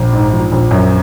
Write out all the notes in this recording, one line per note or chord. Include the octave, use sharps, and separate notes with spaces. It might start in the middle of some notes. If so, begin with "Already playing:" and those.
Already playing: A#1
G#2
F3
A#1
F#2